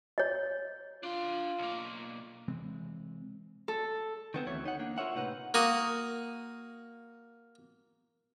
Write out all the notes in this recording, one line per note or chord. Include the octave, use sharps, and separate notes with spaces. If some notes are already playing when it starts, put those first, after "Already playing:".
C#5 D#5
D4 F4 C6
B1 A#3
C3 E3 G#3 C4
A4
D#3 B3 C4
D2 E3 C#5
D#4 F#5
A#3 D4
F4 A#4 C#5 E5 F#5
A2 C3 D#4 B4 F#5
A#3 F#4 D#6